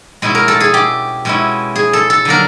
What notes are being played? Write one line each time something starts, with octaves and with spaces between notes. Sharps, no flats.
B2 G#3 C#4 E4
A#4
A4
G#4
G4
B2 G#3 C#4 E4
G#4
A4
A4
D3 F#3 A#3 D4 A#4